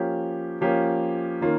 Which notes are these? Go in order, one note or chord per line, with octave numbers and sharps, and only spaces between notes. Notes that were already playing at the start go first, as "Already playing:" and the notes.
Already playing: F3 A#3 C#4 G4
F3 A#3 C#4 G4
D#3 A#3 C#4 F4